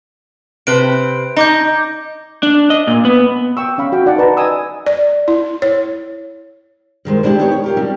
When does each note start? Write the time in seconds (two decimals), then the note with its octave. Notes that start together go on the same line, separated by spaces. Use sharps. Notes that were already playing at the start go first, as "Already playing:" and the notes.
0.67 C3 B4 C5 D7
1.37 D#4 A#5 D6 G6
2.43 D4
2.70 D#5
2.87 A#2
3.05 B3
3.57 G5 C#6 E6
3.78 C#4 F5 B5
3.92 F#4 G5
4.06 D#4 D5 F#5 A5 D6
4.18 B4 A5 A#5
4.37 D#5 G#5 D#6 E6
4.87 D5
5.28 E4
5.62 C#5
7.05 G2 D#3 G#3 C5
7.23 G#3 D4 E4 F4 G4
7.39 B3 D4 D#4 G4 C#5
7.52 C#5
7.64 F4 G4 A#4
7.77 F#3 G3 C#4 D4